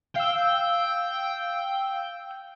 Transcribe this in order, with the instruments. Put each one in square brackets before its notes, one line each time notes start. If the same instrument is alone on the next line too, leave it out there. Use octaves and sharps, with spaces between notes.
[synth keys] F5 E6 [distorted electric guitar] G5